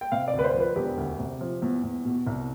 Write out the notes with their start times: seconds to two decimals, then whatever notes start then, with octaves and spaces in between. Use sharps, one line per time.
0.01 G5
0.12 C3 F5
0.28 D5
0.33 D2
0.39 B4
0.44 C5
0.54 F3
0.60 B4
0.76 E1 G4
0.97 D2
1.19 C3
1.41 F3
1.62 E2
1.83 E2
2.05 B2
2.27 C2